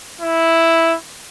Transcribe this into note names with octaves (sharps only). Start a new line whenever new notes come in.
E4